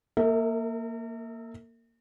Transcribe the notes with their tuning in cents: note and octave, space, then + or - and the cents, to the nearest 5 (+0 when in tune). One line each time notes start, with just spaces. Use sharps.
A#3 -5 A#4 -45 E5 -25